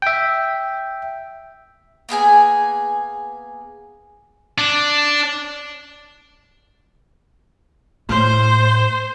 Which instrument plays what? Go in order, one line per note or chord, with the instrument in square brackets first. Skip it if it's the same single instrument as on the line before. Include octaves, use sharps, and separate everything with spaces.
[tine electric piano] E5 G5
[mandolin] A#3 B3 G#4 G#5
[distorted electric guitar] D4
[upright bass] A2 [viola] C5